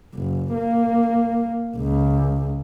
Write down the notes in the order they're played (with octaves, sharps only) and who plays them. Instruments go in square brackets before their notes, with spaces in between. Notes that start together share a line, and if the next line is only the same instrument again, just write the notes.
[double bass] F#1
A#3
C#2